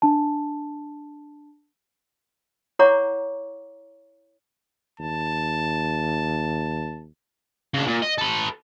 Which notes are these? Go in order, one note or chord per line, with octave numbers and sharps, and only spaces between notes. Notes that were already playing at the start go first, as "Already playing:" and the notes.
D4 A5
E4 C#5 F#5 A#5 C#6 D6
D#2 A5
C#3 D4
A#2
D#5
A4 B4